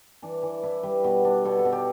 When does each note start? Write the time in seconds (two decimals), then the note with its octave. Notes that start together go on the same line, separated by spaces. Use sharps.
0.22 E3 D4
0.43 E3
0.63 D4 E4
0.83 G3 B4
1.04 B2
1.25 D4
1.45 B2 A4
1.59 A4
1.65 B2
1.72 G4